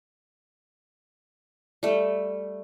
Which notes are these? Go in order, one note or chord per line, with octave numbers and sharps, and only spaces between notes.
G3 A3